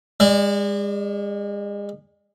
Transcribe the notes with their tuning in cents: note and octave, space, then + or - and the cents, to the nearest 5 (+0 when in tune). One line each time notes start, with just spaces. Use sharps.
G#3 -35 D5 +0